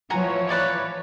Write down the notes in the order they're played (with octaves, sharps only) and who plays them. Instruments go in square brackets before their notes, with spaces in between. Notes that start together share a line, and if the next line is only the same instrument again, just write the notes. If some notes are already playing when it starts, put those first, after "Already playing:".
[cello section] E3 F3 C#5 [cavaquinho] F#4 G#5 A#5
[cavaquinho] B4 D5 D6